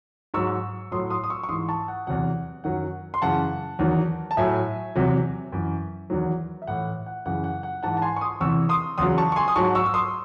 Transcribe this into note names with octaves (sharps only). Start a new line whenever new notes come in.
G#2 F#3 C#6 E6
A2 F#3 C6 D#6
C6 D#6
D#6
C#6 E6
C#6
G#2 E3 C6 D#6
A5 C#6
F#5
E2 C3 F#3 F#5
F#2 D#3 F#3 F#5
C6
F#2 C#3 E3 F#5 A5
E2 D#3 F#3
A5
A2 F#3 E5 G#5
E2 C3 F#3
F#2 E3
E2 D#3 F#3
E5
A2 E3 F#5
F#5
F#2 C#3 E3 F#5
F#5
F#5
G#2 E3 F#5 A5
A5
G#5 C6
C#6
C6 D#6
E2 C3 E3 C#6 E6
C6 D#6
E2 C#3 F#3 C6 D#6
A5 C#6
C#6
G#5 C6
D#6
G#2 F#3 A5 C#6
C#6 E6
E6
C6 D#6